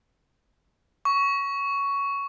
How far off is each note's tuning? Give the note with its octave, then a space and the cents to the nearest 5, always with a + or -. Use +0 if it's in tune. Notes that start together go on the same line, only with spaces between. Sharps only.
C#6 +10